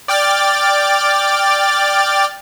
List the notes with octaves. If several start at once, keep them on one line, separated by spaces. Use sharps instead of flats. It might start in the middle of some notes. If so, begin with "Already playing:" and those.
D5 G5 D6 F6 A6